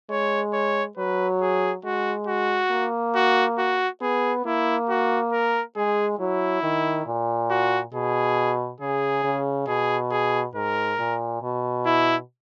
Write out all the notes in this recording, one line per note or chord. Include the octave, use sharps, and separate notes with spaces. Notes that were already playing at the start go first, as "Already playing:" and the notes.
G#3 C#5
C#5
F#3 B4
G#4
G#3 F#4
F#4
A#3
F#4
F#4
B3 G#4
A#3 E4
F#4
A#4
G#3 G#4
F#3 E4
D#3
A#2
F#4
B2 G#4
C#3 G#4
C#3
B2 G#4
G#4
G#2 A#4
A#2
B2
E4